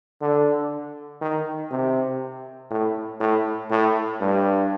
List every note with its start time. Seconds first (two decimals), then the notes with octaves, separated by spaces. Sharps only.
0.21 D3
1.21 D#3
1.71 C3
2.71 A2
3.20 A2
3.70 A2
4.20 G2